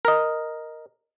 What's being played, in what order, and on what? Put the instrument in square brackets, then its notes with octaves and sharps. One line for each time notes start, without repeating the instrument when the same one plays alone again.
[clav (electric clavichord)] A#4 D#5